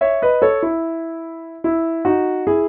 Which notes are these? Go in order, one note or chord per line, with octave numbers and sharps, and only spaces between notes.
C#5 E5
B4 D#5
A4 C#5
E4
E4
D#4 F#4
E4 G#4